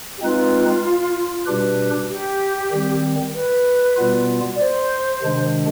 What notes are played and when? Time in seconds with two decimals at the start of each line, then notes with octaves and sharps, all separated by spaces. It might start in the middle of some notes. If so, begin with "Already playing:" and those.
0.16 G4
0.22 G#3 C4 D#4 F4 B4
1.46 B2 G3 D4 G4 B4
2.09 G4
2.71 D#3 G3 C4
3.34 B4
3.96 B2 G3 B3 F4
4.56 D5
4.59 C5
5.22 C3 D#3 G#3 D4